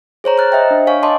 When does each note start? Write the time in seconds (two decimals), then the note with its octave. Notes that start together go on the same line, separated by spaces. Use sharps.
0.24 G#4 C5 C#5 A#5
0.38 A#5 F6 F#6 A6
0.52 C5 D#5 E5 G5
0.71 D4
0.87 C#5 F5 G#5 C#6
1.03 C#5 D#5 F5 A5 C6 D6